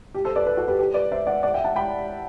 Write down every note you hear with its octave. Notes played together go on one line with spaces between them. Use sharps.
G4
A4 C5
B4 D5
B4 D5
F#4 A4
G4 B4
G4 B4
B4 D5
C5 E5
D5 F#5
D5 F#5
E5 G5
F#5 A5
G5 B5